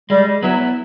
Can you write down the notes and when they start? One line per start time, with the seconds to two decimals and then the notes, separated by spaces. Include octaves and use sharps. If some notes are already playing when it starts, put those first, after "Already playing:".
0.10 G3 G#3
0.42 F#3 B3 E4